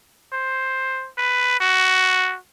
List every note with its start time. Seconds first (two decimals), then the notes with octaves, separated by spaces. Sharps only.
0.32 C5
1.18 B4
1.60 F#4